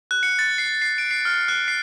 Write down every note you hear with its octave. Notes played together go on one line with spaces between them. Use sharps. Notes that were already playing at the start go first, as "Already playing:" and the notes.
F#6
C#7
A6
C7
C7
D7
C7
F6
F#6
C7